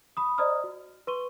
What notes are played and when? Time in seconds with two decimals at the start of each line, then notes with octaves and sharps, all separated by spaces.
0.17 B5 D#6
0.38 C5 D5 D#5 A#5 D#6 F6
0.64 F#4
1.07 B4 C6 C#6 D#7 G7